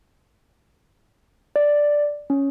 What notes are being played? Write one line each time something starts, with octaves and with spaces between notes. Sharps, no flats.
D5
C#4